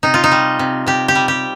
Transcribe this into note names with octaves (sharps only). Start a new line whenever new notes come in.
C3 D#4
F4
D#4
G3
C3
C3 G4
G4
G3
G4